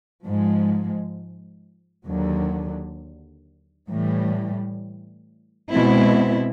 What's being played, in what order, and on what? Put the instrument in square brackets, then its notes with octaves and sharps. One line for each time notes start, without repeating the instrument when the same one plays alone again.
[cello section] G#2 F3 G#3
D#2 D3 F#3
A2 E3 G3
B2 G#3 C4 E4